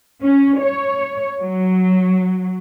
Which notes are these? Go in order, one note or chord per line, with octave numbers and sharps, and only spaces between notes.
C#4
C#5
F#3